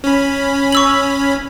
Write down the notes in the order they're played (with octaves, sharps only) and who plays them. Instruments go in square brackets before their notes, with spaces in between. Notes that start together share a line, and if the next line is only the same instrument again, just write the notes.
[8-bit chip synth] C#4 B5
[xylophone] C#6 E6 F#7